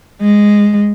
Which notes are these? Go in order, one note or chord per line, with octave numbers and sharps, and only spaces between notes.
G#3